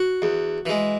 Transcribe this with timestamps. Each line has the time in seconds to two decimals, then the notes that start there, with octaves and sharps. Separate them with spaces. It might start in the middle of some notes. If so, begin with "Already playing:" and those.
Already playing: F#4
0.22 E2
0.66 E3 G#3